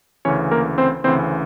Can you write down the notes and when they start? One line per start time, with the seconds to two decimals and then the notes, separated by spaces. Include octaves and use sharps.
0.25 D2 C#3 E3 C#4 C#5
0.51 A#3 A#4
0.78 C4 C5
1.04 D2 C#3 E3 C4 C5